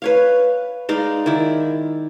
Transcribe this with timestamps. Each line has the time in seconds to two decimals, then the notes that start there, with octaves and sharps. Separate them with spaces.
0.02 B4 C#5 F5
0.89 G#3 D#4 D5 F5
1.26 D#3 E4 D5